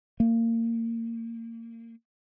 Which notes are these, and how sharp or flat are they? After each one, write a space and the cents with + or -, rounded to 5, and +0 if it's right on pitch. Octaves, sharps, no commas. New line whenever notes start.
A#3 -25